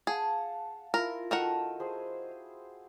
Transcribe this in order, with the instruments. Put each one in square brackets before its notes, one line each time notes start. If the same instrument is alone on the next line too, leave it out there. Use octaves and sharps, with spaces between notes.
[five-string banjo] G#4 [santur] F5 F#5 A5
[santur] E4 F4 [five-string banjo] A#4
[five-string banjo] D#3 A#4 F#5 [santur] F#4 A4 G5
[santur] G#4 C5